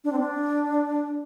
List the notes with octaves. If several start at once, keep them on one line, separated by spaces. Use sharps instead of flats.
D4
C4
D4